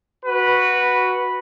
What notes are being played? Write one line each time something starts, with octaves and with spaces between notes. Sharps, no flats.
F#4 B4